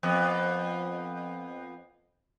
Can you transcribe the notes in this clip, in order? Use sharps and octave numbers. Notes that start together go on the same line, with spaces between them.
F2 B3